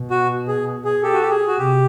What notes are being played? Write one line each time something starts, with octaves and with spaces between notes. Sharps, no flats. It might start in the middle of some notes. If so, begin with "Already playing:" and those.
Already playing: B2
F#4
G#4
G#4
G4 A4
F#4
G4
G#4
F#4
C3 G4